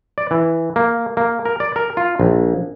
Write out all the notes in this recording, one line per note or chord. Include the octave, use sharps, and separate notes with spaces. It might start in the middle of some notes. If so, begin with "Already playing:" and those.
D5
E3
A#3
A#3
A#4
D5
A#4
F4
A#1